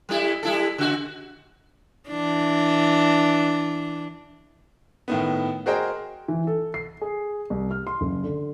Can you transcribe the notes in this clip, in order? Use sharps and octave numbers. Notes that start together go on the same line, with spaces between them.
G3 A3 E4
G3 E4 A4
C#3 F#4
E3 D4
A2 D#3 B3
F#4 G#4 A#4 C5 D#5 G5
E3
A4
C7
G#4
C2
F6
C6
F#1
D3